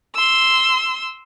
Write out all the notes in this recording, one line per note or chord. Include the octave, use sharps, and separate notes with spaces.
C6 E6